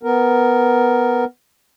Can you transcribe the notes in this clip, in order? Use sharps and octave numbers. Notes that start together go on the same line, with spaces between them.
B3 A#4